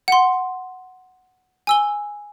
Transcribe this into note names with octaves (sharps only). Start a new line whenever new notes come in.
F#5 C6
G#5 E6 G7